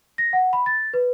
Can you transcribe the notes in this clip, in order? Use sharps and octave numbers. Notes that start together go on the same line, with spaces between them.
A#6
F#5
B5
A6
B4